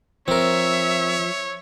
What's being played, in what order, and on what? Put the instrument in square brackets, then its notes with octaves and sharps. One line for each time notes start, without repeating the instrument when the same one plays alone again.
[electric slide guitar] F3 [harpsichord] C4 A#4 [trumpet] C#5 [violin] E5